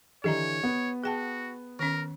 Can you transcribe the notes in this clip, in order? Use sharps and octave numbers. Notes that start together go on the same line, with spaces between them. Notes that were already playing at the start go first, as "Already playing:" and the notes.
D3 E3 G4 C#5 D#5 A#5
B3
F#4 G#4 G5 A5
D#3 C#4 A#4